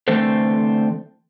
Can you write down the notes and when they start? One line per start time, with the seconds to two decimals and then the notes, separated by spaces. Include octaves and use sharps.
0.08 D3 E3 A3 C4 A4 C5